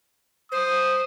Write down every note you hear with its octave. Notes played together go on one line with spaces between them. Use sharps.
C5 D#6